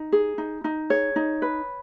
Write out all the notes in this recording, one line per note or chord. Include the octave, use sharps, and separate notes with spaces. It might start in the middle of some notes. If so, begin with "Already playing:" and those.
Already playing: D#4
G#4
D#4
D#4
G#4 C#5
D#4
B4